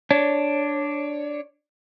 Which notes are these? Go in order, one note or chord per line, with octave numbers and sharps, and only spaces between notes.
D4 C#5